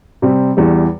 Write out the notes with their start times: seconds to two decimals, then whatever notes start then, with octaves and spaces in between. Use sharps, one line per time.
0.22 C3 G3 C4
0.57 E2 E3 G3